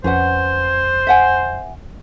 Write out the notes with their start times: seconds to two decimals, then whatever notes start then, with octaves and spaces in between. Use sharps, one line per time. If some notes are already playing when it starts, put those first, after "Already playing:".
0.04 F2 C#4 B4 C5 F#5
1.07 E5 F#5 G#5